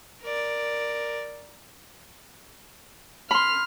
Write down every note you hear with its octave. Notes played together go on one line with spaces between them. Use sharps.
A#4 D5
B5 C6 F6